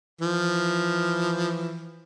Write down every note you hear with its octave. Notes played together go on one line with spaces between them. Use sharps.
E3 F3